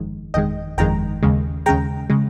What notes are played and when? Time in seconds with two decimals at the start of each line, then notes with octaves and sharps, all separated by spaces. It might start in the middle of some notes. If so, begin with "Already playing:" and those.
Already playing: G1 F2 D#3 G#3
0.34 G1 F2 D#3 G#3 D#5 G5
0.78 G1 F2 D#3 G#3 G5 A#5
1.23 D#2 C#3 G#3
1.66 D#2 C#3 G#3 G5 A#5
2.10 C#3 G#3